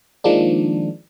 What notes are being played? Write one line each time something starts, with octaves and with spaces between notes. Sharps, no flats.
D#3 F3 G#3 A#3 D4